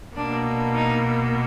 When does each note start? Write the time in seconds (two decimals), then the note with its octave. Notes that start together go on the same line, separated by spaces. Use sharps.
0.15 B2 A#3 D4
0.74 D#4